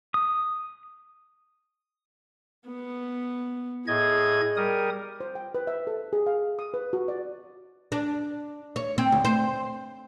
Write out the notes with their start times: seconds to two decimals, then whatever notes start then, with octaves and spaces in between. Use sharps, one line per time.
0.14 D#6
2.67 B3
3.87 A2 G#4 D#5 G#6
4.56 G3 A#4 D#6
5.20 C5
5.35 G5
5.54 B4
5.67 E5
5.87 A4
6.13 G#4
6.27 F5
6.59 D#6
6.74 B4
6.93 F#4
7.08 D5
7.92 D4
8.76 C#5
8.98 C4
9.12 D2
9.25 C5